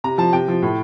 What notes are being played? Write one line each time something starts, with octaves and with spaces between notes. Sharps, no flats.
C3 A#5
F3 A5
C3 G5
F3
A2